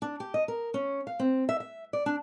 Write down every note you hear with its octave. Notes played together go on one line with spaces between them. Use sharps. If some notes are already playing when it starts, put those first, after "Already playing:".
D4
G4
D#5
A#4
C#4
F5
C4
E5
E5
D5
D4